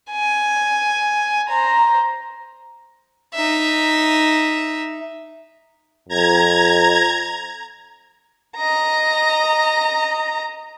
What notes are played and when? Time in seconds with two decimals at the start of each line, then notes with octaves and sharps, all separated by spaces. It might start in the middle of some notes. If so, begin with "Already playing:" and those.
0.11 G#5
1.49 C5 A#5
3.34 D#4 E5
6.09 F2 A#5 G#6
8.57 D#5 A#5